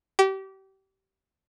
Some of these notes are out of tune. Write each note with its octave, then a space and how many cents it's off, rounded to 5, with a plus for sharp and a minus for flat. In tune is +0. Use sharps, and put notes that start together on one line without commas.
G4 -30